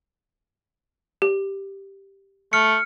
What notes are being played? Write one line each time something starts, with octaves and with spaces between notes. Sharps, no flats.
G4
A3 F6 C#7